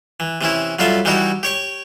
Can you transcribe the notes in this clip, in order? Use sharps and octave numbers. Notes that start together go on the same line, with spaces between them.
E3
C3 E3 C#4 E4
F#3 G3 F4 A4 E5
E3 G3 D#4 E4 F#4 G4
G4 C#5 C#6